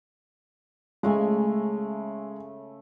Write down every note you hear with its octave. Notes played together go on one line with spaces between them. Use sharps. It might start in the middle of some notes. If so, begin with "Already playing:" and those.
C#3 G#3 A3 G#5